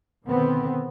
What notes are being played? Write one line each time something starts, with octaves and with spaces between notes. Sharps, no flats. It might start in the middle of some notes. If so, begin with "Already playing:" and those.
B2 D3 D#3 B3 C4